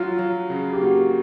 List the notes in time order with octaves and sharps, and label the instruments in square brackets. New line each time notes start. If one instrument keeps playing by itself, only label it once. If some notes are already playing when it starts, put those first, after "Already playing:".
Already playing: [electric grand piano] F#3 [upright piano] F4
[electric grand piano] F#3
C#3
[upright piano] G4
[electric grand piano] A#3 [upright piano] F#4